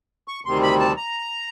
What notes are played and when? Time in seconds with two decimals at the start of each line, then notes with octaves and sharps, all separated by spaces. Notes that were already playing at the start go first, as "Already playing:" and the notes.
0.28 C#6
0.45 D2 C3 D#3 G3 C4 C6
0.63 B5
0.80 A5
0.97 A#5